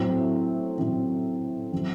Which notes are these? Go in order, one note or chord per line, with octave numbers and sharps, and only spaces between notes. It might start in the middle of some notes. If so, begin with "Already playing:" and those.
Already playing: A2 F#3 C4
A2 F#3 C4
F#3 C4